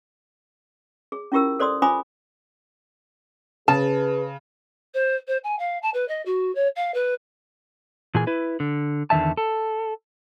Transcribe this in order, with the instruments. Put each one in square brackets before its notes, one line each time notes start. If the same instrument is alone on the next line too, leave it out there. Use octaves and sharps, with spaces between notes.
[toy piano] G#4
C#4 E4 F4 G4 A#4 E6
A4 C5 D5 C6 D#6
F4 C5 G#5 B5 D6 D#6
[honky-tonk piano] C#3 [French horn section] G#4 B4 [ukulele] A5
[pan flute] C5
C5
G#5
F5
A5
B4
D#5
F#4
C#5
F5
B4
[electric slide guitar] A#2 E3 G#4 G#5
E4 B4
D3
E2 D3 D#3 E5 A5
A4